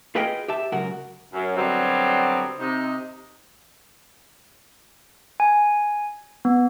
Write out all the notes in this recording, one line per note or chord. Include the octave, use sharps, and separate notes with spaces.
F4 G#4 B4 D#5 F5 G5
G4 E5 A5
C#2 F#2 F#4 A#4 F#5
F#2
D3 F#3 G3 B3 C4
C3 D#4
G#5
B3